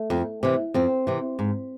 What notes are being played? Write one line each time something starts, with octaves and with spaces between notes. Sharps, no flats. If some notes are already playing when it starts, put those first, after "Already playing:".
Already playing: A3
F2
C3 E3
F2 C4
C3 E3
G#2